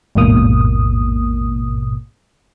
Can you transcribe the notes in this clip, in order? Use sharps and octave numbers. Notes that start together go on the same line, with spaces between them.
A1 E2 G#2 B2 A#3 D#6